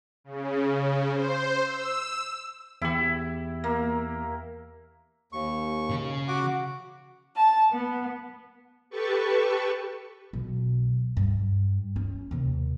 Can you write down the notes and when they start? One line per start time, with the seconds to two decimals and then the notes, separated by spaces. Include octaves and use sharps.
0.24 C#3
1.11 C5
1.65 E6
2.82 E2 E4 G4
3.64 A#3
5.32 D#2 C#6
5.91 C#3
6.28 F#4 F#5 D6
7.35 A5
7.72 B3
8.90 G4 A4 B4 A5 C#6
10.33 B1
11.17 G2
11.96 C#4
12.31 D#2 C3